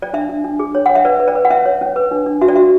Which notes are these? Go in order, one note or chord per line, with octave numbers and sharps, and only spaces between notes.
D5
D4 E5
D4
D4
G#4
C#5
C#5 F#5
E5
B4 D5
B4
D5
B4
F#5
C#4 E5
C#5
C#4
B4
D4
D4
F#4 E5
D5
F#4 E5